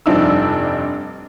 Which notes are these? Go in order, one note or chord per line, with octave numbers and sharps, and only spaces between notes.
F1 G2 F3 D4 D#4 E6